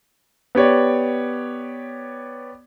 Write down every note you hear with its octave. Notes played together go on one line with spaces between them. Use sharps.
B3 G4 C#5 D5